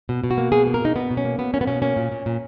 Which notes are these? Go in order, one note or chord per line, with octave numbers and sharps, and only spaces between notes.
B2
B2
F#4
A#3
B2 G#4
A#3
A#4
B2 D#4
B2 B3
B2
C#4
A#3
B2 B3
A#3 C#4
B3
B2 C#4
A#3 C#4
A#2
A#2
A#2